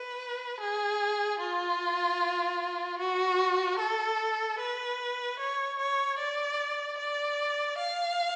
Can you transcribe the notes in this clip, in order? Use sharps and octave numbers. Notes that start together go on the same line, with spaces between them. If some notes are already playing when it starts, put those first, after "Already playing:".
Already playing: B4
G#4
F4
F#4
A4
B4
C#5
C#5
D5
D5
F5